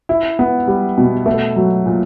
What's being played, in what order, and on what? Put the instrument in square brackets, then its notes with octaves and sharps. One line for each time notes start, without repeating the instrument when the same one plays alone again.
[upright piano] E4
B3
G3
B2
A3
F#3
A#2